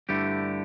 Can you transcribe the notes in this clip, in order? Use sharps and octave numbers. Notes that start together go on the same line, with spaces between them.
G2 D3 A3 E4 G4